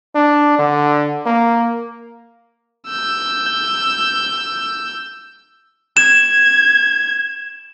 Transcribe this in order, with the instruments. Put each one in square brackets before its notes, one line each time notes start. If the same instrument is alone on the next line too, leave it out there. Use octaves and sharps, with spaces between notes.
[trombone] D4
D3
A#3
[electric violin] E6 G6
[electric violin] G#6 [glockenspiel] E7